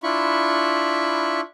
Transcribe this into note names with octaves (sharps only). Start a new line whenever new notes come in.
D4 E4 F4 B5 C#6